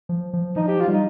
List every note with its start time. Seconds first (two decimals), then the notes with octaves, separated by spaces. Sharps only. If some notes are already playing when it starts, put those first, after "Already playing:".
0.09 F3
0.33 F3
0.56 F3 D#4
0.68 G4
0.80 F4
0.87 G3
0.93 D#4